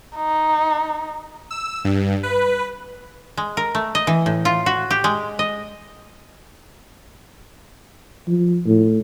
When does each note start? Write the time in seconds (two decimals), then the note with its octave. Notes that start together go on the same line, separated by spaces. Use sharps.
0.17 D#4
1.51 E6
1.85 G2
2.23 B4
3.37 G#3
3.57 A#4
3.75 A3
3.95 D#5
4.07 E3
4.26 A2
4.45 F4
4.66 F#4
4.91 G4
5.04 G#3
5.39 D#5
8.27 F3
8.66 A2